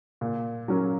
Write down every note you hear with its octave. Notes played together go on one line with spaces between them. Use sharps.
A#2
F#3 C#4 A#4